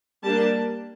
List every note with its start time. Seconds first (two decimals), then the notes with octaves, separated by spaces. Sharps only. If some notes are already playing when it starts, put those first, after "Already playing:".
0.24 G3 A#3 D4 A5